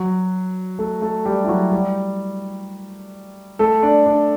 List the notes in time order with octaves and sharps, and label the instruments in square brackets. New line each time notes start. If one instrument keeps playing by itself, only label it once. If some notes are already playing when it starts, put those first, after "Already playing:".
Already playing: [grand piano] F#3 F#4
A3 A4
A3 A4
G3 G4
E4
F#3 F#4
G3 G4
A3 A4
D4 D5
D4 D5